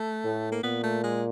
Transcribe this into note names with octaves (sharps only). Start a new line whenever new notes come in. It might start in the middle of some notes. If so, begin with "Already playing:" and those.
Already playing: A3
A2
A#3
A#2 B3
A3
G#3